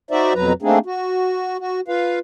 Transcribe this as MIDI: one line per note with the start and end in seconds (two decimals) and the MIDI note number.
0.11 0.33 63
0.11 0.33 66
0.11 0.33 72
0.11 0.33 74
0.11 0.33 76
0.35 0.53 41
0.35 0.53 47
0.35 0.53 54
0.35 0.53 71
0.35 0.53 82
0.62 0.79 57
0.62 0.79 58
0.62 0.79 60
0.62 0.79 62
0.62 0.79 63
0.62 0.79 68
0.86 1.58 66
1.59 1.81 66
1.88 2.19 65
1.88 2.19 71
1.88 2.19 77